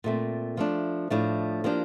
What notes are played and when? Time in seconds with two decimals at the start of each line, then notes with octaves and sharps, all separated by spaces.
0.04 A#2 A3 C4
0.57 F3 A3 D4
1.10 A2 F3 A3 D4
1.64 F3 A#3 D4 G4